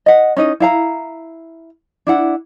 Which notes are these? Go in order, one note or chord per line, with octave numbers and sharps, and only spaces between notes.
D#5 F#5
C#4 D#4 D#5
E4 F5 A#5
D4 E4 F#5